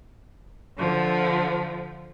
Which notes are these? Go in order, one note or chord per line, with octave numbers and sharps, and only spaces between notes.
D3 F3